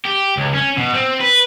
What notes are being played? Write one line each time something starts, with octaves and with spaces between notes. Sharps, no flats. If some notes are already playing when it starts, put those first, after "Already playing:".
G4
C#2
C#4
B2
C4
B4